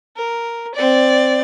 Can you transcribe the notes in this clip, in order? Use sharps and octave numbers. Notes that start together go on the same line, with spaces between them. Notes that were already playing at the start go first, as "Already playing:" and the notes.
A#4
C4 D5